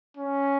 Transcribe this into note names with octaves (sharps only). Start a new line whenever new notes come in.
C#4